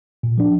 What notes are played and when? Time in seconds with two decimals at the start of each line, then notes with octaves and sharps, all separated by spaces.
0.23 A#2
0.38 F3 D4